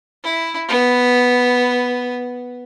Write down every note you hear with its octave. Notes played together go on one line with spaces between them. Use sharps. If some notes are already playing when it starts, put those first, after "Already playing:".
E4
B3